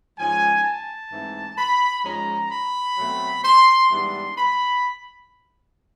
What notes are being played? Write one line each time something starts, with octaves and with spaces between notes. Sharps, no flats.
G#2 F3 G#3 C#4 G#5
A5
G#2 E3 A3 C4 E4
B5
G#2 F3 G#3 C#4 A#5
B5
B2 F#3 A3 C4
C6
G#2 E3 G3 B3 D4 C6
B5